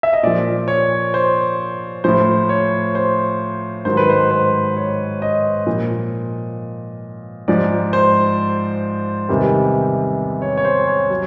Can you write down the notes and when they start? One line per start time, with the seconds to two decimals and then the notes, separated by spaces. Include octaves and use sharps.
0.03 E5
0.13 D#5
0.23 A#2 F3 D5
0.68 C#5
1.14 C5
2.04 A2 F3 C5
2.49 C#5
2.95 C5
3.85 G#2 D#3 F#3 C5
3.97 B4
4.10 C5
4.31 C5
4.77 C#5
5.22 D#5
5.67 A#2 F3
7.48 G#2 F3 D5
7.93 C5
9.29 E2 C3 D#3 G3
10.42 C#5
10.57 C#5
10.65 C5
10.88 C#5
11.10 F#3